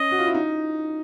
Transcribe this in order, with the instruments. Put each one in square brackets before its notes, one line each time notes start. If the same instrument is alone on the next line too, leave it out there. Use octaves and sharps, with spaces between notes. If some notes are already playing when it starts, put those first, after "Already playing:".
Already playing: [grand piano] C#4 [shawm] D#5
[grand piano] F#4
F4
E4
D#4